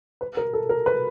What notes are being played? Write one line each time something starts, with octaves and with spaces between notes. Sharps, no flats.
B4
A#4
A4
A#4
B4